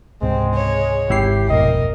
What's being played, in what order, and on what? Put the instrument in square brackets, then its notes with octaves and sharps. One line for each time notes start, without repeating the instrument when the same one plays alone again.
[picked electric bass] C#2 G#2 C3 [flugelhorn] G#3 [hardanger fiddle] C4
[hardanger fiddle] C#5
[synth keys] G#1 E4 C7 [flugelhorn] G4
[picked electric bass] F1 D2 B2 [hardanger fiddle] A#4 [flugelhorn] D#5